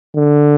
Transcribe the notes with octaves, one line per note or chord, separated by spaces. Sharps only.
D3